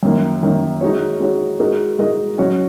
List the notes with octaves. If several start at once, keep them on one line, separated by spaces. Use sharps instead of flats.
F#2 D#3 A#3
F#2 D#3 A#3
G#3 D#4 F#4 C#5
G#3 D#4 F#4 C#5
G#3 D#4 F#4 A#4 D#5
G#3 D#4 F#4 A#4 D#5
F#3 C#4 F#4 C#5